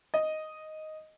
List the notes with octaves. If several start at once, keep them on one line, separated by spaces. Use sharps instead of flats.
D#5